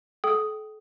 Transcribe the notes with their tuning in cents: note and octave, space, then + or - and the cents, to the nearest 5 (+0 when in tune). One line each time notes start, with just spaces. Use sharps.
A4 -40 G5 -20 D#6 +0